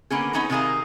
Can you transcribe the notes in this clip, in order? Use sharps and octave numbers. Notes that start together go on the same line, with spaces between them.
D3 A#3 B3 C#4 G#4
B3 C#4 D#4 G#4 B4 A#5
C3 D#3 D#4 G#4 A#4 F5